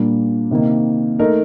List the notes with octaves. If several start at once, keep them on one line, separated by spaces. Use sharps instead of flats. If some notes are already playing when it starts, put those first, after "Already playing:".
Already playing: A#2 G3 A#3 D4
C3 D#3 A#3
A3 D#4 A#4